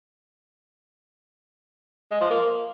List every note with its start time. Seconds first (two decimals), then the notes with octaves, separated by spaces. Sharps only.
2.11 G#3
2.21 F3
2.30 A#3